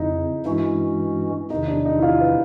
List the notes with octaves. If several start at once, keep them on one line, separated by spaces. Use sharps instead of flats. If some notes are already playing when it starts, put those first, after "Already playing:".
Already playing: F2 C#3 D#4 E4
G2 E3 G#3 C#4 E4 F#4
E2 C3 D#3 D#4
D4
D#4
E4
F4
B4